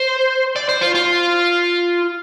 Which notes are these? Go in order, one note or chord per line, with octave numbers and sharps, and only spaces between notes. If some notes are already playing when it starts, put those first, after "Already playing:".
Already playing: C5
D5
C5
F4
F4